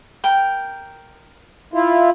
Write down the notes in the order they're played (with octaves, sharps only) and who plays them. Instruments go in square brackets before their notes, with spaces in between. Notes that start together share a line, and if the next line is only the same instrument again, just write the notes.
[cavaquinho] A#4 G5
[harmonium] E4 F4